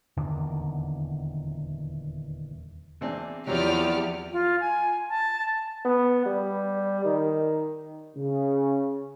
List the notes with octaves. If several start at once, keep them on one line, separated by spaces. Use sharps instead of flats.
D#1 E2 D3 D#3
E2 C4 D4
E2 F3 F#3 C4 G4 D5 F6
F4
G#5
A5
B3
G3
D#3
C#3